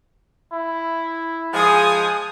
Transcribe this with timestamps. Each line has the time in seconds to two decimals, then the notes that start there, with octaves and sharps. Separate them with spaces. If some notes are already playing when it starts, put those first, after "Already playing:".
0.53 E4
1.54 F3 G#3 G#5 D#6